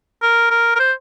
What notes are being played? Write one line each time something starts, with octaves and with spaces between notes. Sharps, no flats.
A#4
A#4
A#4
C5